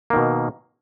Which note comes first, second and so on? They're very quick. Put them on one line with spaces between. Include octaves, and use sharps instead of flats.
A#3 D#3 B2